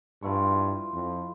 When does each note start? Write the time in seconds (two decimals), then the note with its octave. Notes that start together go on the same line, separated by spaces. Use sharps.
0.23 G2 F3 E4 C#6
0.93 F2